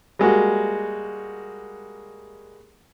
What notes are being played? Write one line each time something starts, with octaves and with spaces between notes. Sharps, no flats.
G3 G#3 A#3 F#4